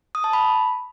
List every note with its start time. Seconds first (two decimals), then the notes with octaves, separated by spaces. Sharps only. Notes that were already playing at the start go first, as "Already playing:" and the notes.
0.15 D#6
0.24 A5
0.33 B5